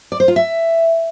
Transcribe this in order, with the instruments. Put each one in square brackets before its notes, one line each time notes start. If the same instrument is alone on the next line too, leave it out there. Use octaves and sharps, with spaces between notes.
[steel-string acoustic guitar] D5
C5
F4
E5